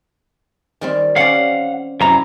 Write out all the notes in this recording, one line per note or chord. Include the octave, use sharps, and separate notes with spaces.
D#3 G3 C4
C4 C#4 D5 F5 F#5
F#2 C3 E4 A#5